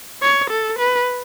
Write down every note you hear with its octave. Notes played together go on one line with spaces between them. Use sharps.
C#5
A4
B4